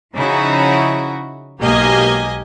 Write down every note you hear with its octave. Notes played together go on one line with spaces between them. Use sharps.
C#3 F3 D#4 E4 F#4
B1 G#2 A#3 G4 D#5 G#5